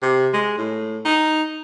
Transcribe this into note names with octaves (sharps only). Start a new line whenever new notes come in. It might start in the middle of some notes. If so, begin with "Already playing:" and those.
C3
G#3
A2
D#4